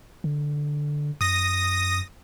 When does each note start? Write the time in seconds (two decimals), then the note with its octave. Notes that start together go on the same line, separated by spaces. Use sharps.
0.24 D3
1.21 F#2 D#6 A#6